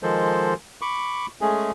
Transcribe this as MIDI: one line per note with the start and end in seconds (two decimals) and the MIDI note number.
0.03 0.54 51
0.03 0.54 53
0.03 0.54 56
0.03 0.54 69
0.03 0.54 72
0.82 1.26 83
0.82 1.26 85
0.82 1.26 86
1.41 1.71 56
1.41 1.71 57
1.41 1.71 61
1.41 1.71 68